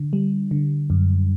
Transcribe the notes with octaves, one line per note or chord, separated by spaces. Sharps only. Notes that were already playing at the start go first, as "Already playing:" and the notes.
Already playing: D3
G3
D3
F#2